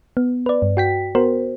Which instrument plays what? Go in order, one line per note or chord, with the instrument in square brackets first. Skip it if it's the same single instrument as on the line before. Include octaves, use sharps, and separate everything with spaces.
[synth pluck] B3
B4 D5
G2
F#4 G5 B6
B3 F#4 A#4 C5